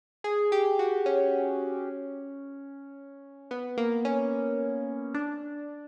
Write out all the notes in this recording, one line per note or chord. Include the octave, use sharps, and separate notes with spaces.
G#4
G4
F#4
C#4
B3
A#3
C#4
D4